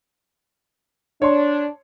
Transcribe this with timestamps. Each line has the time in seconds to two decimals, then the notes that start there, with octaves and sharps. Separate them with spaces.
1.22 D4 C#5 C6